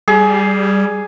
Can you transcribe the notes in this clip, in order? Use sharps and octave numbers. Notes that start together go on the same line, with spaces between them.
G3 G#4